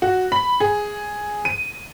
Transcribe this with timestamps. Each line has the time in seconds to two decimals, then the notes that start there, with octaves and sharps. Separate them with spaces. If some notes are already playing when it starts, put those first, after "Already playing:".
0.02 F#4
0.32 B5
0.60 G#4
1.45 D#7